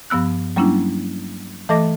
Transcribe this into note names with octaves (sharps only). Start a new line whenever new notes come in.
G2 F3 B3 E6 F#6
F#3 G3 A#3 C#4 D4 E4
E3 A3 A4 D#5 D6 A#6